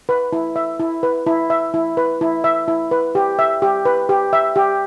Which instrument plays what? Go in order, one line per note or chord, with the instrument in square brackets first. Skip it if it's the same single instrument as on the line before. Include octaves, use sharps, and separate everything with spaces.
[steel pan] B4
E4
E5
E4
B4
E4
E5
E4
B4
E4
E5
E4
B4
G4
E5
G4
B4
G4
E5
G4